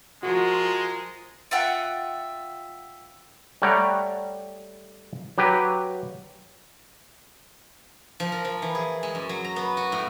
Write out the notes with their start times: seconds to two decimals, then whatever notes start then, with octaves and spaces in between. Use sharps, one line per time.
0.23 F3 G#3 F4 F#4 A#4
1.51 F4 E5 F#5 G5
3.62 G3 A3 C#5 F#5 G5 A#5
5.38 F#3 G4 B4
8.20 F3
8.32 A#4
8.45 F3
8.62 E3
8.75 G#4
9.03 G#3
9.15 F#2
9.29 F#3
9.45 A#5
9.56 B3
9.77 F#4
9.92 A2